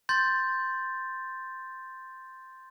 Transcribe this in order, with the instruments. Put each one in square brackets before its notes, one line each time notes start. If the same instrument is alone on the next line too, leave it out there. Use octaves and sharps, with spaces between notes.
[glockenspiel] C6 G6 A6